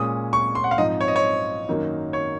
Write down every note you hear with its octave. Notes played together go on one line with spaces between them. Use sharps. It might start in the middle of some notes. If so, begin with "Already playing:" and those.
Already playing: A#2 G#3 C#4 D#6
C#6
C6
F#5
F5
G#2 F3 C4 D#4 D#5
C#5
D#5
C#5
F#2 D#3 F#3 A#3 D#4
C#5